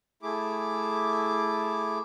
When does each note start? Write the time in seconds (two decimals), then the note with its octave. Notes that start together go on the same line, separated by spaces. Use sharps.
0.23 A3 E4 G#4 D6